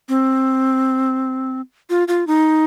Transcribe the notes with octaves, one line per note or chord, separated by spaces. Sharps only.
C4
F4
F4
D#4